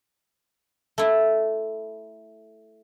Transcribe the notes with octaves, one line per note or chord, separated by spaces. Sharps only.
A3 E4